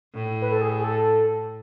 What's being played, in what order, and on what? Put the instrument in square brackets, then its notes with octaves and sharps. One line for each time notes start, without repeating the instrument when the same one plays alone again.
[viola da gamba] A2
[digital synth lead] B4
A4
G#4
G#4
A4